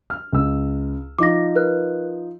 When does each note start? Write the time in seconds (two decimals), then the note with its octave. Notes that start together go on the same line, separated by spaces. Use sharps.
0.10 F6
0.33 C#2 E6
1.19 F3 D#4 D6 A#6
1.55 A#4 B4 F#6